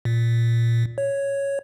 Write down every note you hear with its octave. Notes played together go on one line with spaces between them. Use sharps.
A#2
C#5